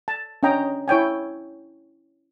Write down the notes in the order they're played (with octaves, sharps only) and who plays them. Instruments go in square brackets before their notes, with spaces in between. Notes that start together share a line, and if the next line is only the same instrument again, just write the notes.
[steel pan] A5
C#4 D4 D#5 G5 A#5
E4 C#5 G5 G#5